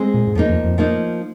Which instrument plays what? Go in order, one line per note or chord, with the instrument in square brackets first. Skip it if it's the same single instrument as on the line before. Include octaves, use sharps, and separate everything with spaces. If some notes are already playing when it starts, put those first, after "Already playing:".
Already playing: [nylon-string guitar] G#3 C4 G#4 C5
[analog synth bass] A#2
G#2
[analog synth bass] F2 [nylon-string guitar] F3 A#3 D#4
[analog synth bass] F2
F2
[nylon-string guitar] F3 A#3 D#4